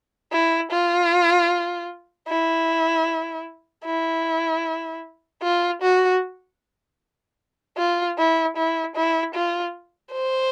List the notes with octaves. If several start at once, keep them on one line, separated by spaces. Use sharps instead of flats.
E4
F4
E4
E4
F4
F#4
F4
E4
E4
E4
F4
C5